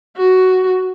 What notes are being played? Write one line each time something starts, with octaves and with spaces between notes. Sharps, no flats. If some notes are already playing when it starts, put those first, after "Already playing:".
F#4